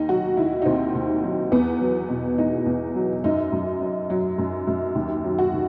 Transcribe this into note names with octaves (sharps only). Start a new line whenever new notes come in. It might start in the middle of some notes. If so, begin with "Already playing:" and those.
Already playing: D#2 D#4
F#3 F#4
D#3 E4
D#4
D#2 C4
D#2
F#3
E2 B3
F#3
B2
E2 D#4
E2
F#3
F#2 D#4
F#2
F#3
F#3
F#2
F#2
D#2
F#3
F#4
D#3